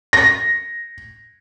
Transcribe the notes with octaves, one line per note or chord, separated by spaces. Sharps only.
A#6